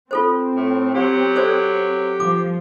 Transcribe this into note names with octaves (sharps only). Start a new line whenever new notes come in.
C4 F4 A4 C5
A2
F#3 G4
A4 C5 D5
F3 D6